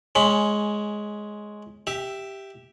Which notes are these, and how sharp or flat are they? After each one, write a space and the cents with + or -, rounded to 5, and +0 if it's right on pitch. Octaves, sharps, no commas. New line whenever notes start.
G#3 +10 C#4 +0 B5 +25
G4 +0 E5 +5